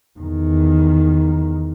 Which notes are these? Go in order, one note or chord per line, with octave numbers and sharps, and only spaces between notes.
E2 D#3